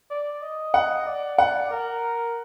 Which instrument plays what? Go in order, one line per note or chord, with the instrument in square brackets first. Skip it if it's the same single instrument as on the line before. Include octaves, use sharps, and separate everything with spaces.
[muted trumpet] D5
D#5
[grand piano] F#5
[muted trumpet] D5
[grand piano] F#5
[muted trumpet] A#4